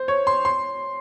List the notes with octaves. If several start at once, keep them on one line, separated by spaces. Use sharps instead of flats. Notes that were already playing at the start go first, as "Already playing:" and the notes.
Already playing: C5
C#5
C6
C6